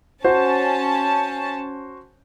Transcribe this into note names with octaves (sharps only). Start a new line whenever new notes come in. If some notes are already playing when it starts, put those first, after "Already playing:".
C#4 F#4 C5 A5